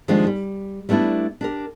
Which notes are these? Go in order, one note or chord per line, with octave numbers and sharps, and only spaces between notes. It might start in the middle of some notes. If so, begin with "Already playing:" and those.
D#3 F3 G3 G#3 A#3 D4
G3
G3 A3 B3 D4 E4
D4 G4 A#4